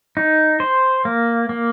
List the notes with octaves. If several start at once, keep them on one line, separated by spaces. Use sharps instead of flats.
D#4
C5
A#3
A#3